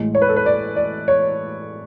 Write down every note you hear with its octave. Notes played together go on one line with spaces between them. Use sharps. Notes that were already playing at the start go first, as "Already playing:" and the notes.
Already playing: A1 A2 G#3
C#5
B4
A4
B4
D5
D5
C#5